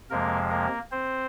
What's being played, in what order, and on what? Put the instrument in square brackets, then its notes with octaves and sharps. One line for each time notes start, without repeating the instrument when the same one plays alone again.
[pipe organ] F2 C3 F3 G#3 A#3 A#4
A#3 A#4
C4 C5